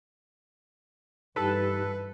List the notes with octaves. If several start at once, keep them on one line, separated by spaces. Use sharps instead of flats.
G2 E3 D#4 G4 A4 B4 B5